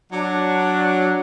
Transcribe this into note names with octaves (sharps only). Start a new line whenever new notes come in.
F#3 D4